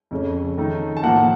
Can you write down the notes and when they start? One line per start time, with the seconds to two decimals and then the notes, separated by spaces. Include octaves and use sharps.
0.11 F2 C#3 A3 C#4
0.58 D#3 A3 D#4
0.97 A5
1.03 A2 F3 A#3 F#5